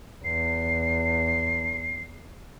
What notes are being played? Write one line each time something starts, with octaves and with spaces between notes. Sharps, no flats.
E2 C7